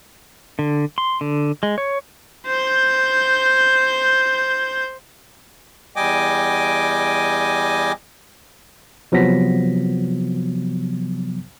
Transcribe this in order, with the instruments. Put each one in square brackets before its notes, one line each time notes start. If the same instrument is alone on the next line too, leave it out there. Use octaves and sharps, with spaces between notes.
[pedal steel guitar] D3
C6
D3
G#3
C#5
[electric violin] C5 G6
[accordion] E2 G3 D#5 G5 G#5 D6
[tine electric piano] C3 F3 F#3 B3 A#6 B6